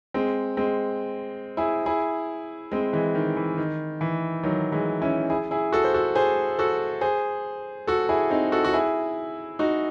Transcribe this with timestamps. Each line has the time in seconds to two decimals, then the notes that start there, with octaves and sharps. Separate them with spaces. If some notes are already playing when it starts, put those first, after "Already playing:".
0.14 G#3 C4
0.57 G#3 C4
1.57 E4 G#4
1.86 E4 G#4
2.72 G#3 C4
2.93 E3 G#3
3.15 D#3
3.37 E3
3.57 D#3
4.01 E3
4.43 D#3 F#3
4.72 E3 G#3
5.02 C#4 E4
5.30 E4 G#4
5.51 E4 G#4
5.73 F#4 A4
5.84 C5
5.94 F#4 A4
6.15 G#4 C5
6.59 F#4 A4
7.01 G#4 C5
7.87 F#4 A4
8.09 E4 G#4
8.30 C4 D#4
8.52 F#4 A4
8.64 F#4
8.73 E4 G#4
9.59 D#4 F#4